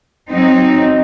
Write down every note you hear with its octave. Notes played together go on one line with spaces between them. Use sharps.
F#3 C4 D#4